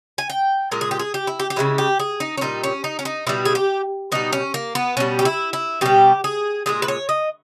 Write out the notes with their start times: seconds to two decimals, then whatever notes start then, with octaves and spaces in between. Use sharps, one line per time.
0.18 G#5
0.30 G5
0.71 A#2 G#3 A#4
0.81 G#4
0.91 G4
0.99 G#4
1.14 G4
1.27 E4
1.40 G4
1.50 G4
1.56 C#3 E3 G#3 E4
1.78 G4
2.00 G#4
2.20 D#4
2.38 C#4
2.41 A#2 G3 D#4
2.64 C#4
2.84 D#4
2.99 C#4
3.05 D#4
3.27 B2 G3 E4
3.45 G#4
3.55 G4
4.12 B2 G3 D#4
4.33 C#4
4.54 A#3
4.75 B3
4.97 B2 G3 C#4
5.19 G4
5.25 E4
5.53 E4
5.81 B2 G3 G4
6.24 G#4
6.66 A#2 G#3 G#4
6.82 B4
6.88 C#5
7.09 D#5